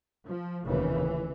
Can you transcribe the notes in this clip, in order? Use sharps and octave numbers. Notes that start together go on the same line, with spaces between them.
F3
F1 D#2 C#3 E3